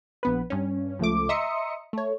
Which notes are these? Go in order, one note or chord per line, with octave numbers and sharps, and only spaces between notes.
A#1 B3 B4
G2 C#4
C#2 F3 A3 D6
D#5 E5 A#5 C6 D#6 C#7
A3 C#5